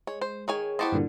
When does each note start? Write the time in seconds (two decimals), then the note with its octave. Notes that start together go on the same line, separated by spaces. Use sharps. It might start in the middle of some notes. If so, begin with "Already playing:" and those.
0.07 G#3 C#5
0.21 C5
0.48 D#3 G#4 C#5 G#5
0.79 B3 E4 G4 C5 D#5 A5 C#6
0.92 G2 A#2 D3